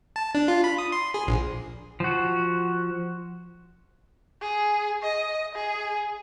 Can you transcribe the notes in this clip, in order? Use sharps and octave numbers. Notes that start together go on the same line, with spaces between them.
A5
D4
F4
B5
D#6
C6
G#4
A#1
F3 F#4
G#4
D#5
G#4